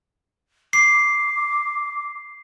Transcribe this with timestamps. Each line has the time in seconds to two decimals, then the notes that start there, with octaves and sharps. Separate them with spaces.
0.73 D6 C7